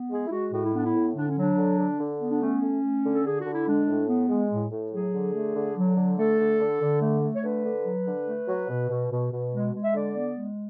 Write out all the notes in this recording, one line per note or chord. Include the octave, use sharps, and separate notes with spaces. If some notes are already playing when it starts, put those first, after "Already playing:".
Already playing: B3
G#3 G#4
E4
G#3 F#4
A2 F#4
E4
B3 D4
E4
A2
D3 D4
C#4
F#3 D4
D3
D3
D3
B3
D4
A3 C#4
A3
A3
D3
A4
D3 G#4
F#4
D3
E4
G#3 D4
A2
B3
G#3
A2
A2
F#3 G#4
D3
A3
D3
F#3
D3
A3 A4
D3
D3
D3
A3
A3
C#5
D3 B4
D3
F#3
D3
A3
F#3
B2
B2
B2
B2
G#3
G#3
E5
D3 D5
B3
G#3